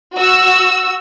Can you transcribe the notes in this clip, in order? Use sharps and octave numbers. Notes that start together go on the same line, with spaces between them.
F#4 E6